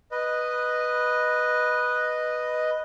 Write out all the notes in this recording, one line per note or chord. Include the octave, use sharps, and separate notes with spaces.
B4 D#5